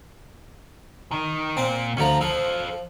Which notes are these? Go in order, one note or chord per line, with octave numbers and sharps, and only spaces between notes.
D#3 D#4
A#2 C4
D2 D3 F3 C#4 A#5
F3 A4 C5